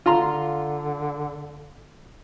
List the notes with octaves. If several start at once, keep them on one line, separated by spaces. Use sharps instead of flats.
D3 F4 A#5 C6